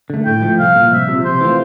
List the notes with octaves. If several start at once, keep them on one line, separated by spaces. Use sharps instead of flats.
D3 A3
A2 G5
F3 A3
C2 F5
A#2 F3
C2 E5
C3 F3
C3 C5
E3 A3 C4 F4